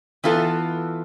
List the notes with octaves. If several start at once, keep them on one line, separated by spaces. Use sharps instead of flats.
E3 B3 F4 A4